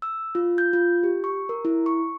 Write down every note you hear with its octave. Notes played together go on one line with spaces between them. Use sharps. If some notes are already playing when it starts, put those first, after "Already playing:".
E6
F4
G6
F4
G4
C#6
A#4
E4
C#6